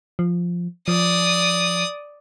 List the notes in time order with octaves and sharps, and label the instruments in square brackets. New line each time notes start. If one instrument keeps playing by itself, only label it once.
[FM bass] F3
[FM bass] F3 [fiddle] D5 D#6